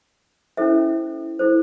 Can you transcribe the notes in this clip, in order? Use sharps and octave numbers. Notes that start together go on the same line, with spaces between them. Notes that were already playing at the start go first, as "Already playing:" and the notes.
C#4 E4 A4 C5 E5
E4 A4 C5